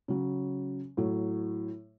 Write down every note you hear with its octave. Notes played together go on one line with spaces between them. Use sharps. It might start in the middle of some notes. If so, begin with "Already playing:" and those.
C#3 F#3
A2 F#3